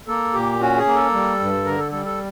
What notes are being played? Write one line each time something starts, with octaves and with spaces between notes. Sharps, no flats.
A#3 A4
A#2 G4
C#4 F#4
G#4
A#3
A4
G3
G2
D3 A#4
A4
G3 A4
A4